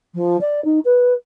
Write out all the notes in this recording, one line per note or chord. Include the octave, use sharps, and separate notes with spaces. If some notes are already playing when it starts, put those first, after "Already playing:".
F3
D5
D#4
B4